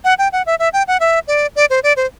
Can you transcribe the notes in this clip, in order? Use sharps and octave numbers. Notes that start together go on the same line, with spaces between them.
F#5
G5
F#5
E5
E5
G5
F#5
E5
D5
D5
C5
D5
C5